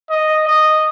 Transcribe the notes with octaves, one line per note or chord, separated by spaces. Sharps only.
D#5
D#5